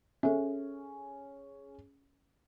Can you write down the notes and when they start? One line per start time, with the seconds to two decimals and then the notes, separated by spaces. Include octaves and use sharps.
0.23 C#4 G#4 A4 E5